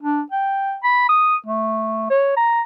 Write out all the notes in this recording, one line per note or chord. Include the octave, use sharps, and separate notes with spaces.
D4
G5
B5
D#6
A3
C#5
A#5